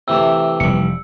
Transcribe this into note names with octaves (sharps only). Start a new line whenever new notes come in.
C3 E3 A3 E6
F1 G3 C#7